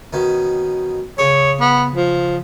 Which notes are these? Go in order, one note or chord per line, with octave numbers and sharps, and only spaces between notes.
B2 D#3 C#4
C#3 G#4 C#5
B3
F3